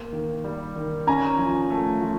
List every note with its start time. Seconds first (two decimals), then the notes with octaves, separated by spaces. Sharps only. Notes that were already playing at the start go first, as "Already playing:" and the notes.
Already playing: A#3
0.12 D#3
0.44 G3
0.76 D#3
1.07 C#4 G#5 A#5
1.38 F3
1.70 A3
2.02 F3